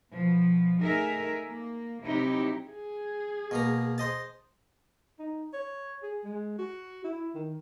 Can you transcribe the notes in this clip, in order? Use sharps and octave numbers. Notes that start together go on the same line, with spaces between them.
B2 F3
A3 D#4 G#4 A#4 E5
A#3
C3 F#3 D#4 E4 G4
G#4
B2 A#3 A#5
C5 D#5 A5
D#4
C#5
G#4
G#3
F#4
E4
D#3